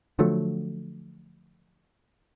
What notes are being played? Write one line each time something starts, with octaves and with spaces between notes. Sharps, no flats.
D3 F3 F#3 A3